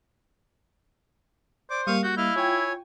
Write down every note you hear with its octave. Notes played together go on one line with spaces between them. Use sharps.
C5 D5 D6
G3 A#3 F5 C#6 D#6
F#4 G6
E4 D#5 F5 F6
F4 C#5 G5 G#5